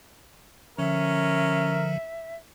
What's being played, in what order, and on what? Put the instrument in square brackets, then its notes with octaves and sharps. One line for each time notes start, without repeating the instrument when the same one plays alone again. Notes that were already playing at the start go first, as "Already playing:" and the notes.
[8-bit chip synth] D3 F3 [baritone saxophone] C#4 [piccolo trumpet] A#4 [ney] E5